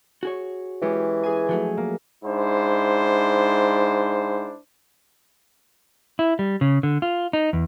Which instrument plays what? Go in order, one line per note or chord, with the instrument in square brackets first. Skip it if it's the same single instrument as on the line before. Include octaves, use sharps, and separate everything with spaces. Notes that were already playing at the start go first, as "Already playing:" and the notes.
[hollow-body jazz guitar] F#4 G#4 C#5
[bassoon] E3 [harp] G#3 C#4 G4
[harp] G#4 G#5
[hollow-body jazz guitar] F3 F#3 A3
[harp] A#3
[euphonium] G#2 [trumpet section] D4 E4 C5
[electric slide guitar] E4
G3
C#3
D3
F4
D#4
E2